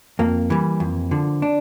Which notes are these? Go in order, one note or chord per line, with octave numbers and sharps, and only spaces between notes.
F2 A#3
E3 G3
F2
D3 F3
D4